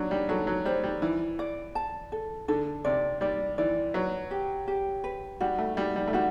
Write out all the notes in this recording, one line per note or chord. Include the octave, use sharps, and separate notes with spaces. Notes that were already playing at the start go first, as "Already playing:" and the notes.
Already playing: F#3 D4
G3
F#3 A4
F#3
G3 C5
G3
E3 D5
D5
A5
A4
D3 A4
C3 D5
G3 D5
E3 D5
F#3 B4
G4
G4
B4
G3 F#4
A3
G3 F#4
G3
A3
G3 F#4